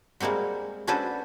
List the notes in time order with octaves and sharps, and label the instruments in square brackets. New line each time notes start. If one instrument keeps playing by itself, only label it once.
[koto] G3 G#3 A#3 C4 F#4
C#4 D4 F#4 A4 B4 C5